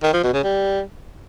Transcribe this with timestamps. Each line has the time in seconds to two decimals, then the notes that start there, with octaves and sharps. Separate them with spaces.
0.03 D#3
0.13 F3
0.23 B2
0.34 C#3
0.44 G3